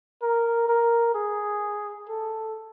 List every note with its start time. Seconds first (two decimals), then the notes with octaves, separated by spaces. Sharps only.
0.22 A#4
0.68 A#4
1.14 G#4
2.08 A4